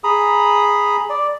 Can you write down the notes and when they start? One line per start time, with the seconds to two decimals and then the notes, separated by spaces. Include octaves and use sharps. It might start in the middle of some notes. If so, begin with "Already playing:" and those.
0.04 G#4 A#5 B5 D#6
1.10 D5